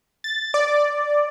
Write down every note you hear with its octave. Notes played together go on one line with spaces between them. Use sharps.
A6
D5